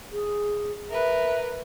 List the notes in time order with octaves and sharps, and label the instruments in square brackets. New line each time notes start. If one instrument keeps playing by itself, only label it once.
[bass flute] G#4
[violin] A#4 B4 [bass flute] E5